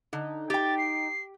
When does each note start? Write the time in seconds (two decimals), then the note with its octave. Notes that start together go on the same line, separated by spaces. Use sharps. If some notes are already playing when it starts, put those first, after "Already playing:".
0.13 D3 D#4
0.50 G4 G5 A6
0.78 C7